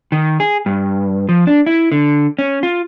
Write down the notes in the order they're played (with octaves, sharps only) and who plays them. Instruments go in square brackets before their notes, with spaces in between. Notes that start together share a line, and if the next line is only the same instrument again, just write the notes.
[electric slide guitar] D#3
G#4
G2
F3
D4
E4
D3
C#4
F4